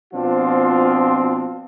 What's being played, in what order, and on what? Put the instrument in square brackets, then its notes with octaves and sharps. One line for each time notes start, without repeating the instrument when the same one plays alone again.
[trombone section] B2 F3 C4 D4 F4